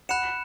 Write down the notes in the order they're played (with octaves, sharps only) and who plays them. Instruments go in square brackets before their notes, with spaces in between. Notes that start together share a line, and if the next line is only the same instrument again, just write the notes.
[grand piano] F#5 [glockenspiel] B5 F#6 C#7 E7